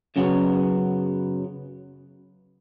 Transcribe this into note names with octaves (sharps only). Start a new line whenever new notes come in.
F#2 C#3 F#3 B3